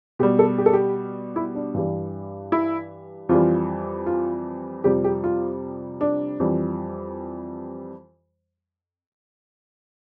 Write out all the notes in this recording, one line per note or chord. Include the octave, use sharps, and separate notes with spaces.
B2 G3 G4
A4
G4
A4
G4
E4
D4
G2 E3 G3
E4
F2 E3 G3 F4
F4
F2 C3 G3 G4
G4
F4
D4
F2 E3 G3